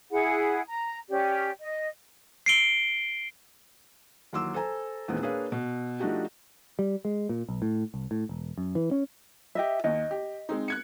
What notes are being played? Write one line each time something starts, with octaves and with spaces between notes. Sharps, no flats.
E4 G#4 F#5
A#5
C#4 G4 D5
D#5
C7 D7 G7
D#2 E3 F#3 C6 D6 E6
A4 C5 G#5 A#5
E2 A#2 D#3 G#3 B3 C4
A#3 D4 G#4 B4 C#5 F5
B2
F3 A3 D4 D#4 F#4 G4
G3
G#3
A#2
B1
A2
C2
A2
E1
F#2
E3
C#4
G4 D#5 E5
D#2 D#5
G4
G#3 C4 D#4
F#6 G#6 C#7